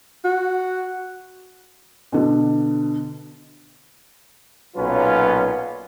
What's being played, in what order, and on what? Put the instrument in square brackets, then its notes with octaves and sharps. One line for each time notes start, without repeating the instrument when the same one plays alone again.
[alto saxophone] F#4
[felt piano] B2 D3
[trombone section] B1 A#2 F#3 C#4 F4 B4